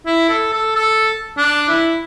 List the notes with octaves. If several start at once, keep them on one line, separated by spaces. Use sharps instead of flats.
E4
A4
A4
A4
D4
E4